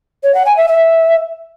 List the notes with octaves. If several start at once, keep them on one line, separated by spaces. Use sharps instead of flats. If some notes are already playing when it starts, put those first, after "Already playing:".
C#5
F#5
G#5
E5
E5